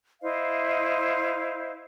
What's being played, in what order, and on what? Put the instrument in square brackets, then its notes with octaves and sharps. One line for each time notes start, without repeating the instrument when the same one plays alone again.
[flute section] E4 C5 D#5 F5